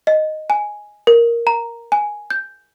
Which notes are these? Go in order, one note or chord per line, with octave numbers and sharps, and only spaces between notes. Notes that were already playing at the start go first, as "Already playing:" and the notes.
D#5
G#5
A#4
A#5
G#5
G6